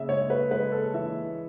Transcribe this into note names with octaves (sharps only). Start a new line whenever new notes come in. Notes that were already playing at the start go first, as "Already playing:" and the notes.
Already playing: C#3 E5
G#3 C#5
B4
G#3 B4
A4
E3 E5